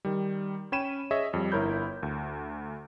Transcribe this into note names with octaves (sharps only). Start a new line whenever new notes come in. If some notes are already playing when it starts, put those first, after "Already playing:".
D#3 G3
C#4 C#5 G5 B5 D#7 E7
G#4 C#5 D#5 E5
F2 G3
G1 E4 A#4 C#5 B5 G6
D2